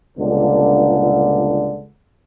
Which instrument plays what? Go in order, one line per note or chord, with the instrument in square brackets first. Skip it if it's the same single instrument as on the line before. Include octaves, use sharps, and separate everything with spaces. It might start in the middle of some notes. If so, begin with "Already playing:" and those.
[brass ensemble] G1 C#2 A#2 D3